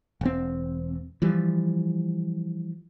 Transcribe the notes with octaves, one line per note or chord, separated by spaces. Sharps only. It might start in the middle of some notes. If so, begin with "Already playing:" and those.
E1 C4
E3 F3 G3